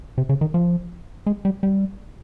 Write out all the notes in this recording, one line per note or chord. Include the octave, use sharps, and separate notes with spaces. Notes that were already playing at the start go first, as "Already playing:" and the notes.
C3
C#3
D#3
F3
G#3
G3
G3